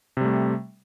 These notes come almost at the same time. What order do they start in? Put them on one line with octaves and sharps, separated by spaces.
C3 G3 A3